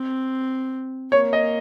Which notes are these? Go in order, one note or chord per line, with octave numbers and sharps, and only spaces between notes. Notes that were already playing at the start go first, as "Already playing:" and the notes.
Already playing: C4
A#3 C#5
D#5